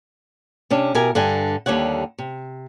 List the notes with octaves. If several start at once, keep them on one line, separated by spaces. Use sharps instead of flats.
C3 C#4 D4
B2 E4 G4 A#4 G#5
G2 D3 F#5 G#5
D#2 D3 G3 C#5 F#5
C3